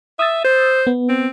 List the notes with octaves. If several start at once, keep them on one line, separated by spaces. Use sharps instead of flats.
E5 D#6 E6 A6
C5
B3
C4